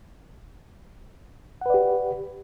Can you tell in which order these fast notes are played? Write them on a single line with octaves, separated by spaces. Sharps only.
F#5 B4 D5 G4